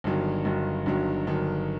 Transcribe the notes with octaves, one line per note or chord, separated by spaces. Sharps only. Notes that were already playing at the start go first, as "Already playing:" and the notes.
G1 G2 D#3 F#3
G1 G2 D#3 F#3
G1 G2 D#3 F#3
G1 G2 D#3 F#3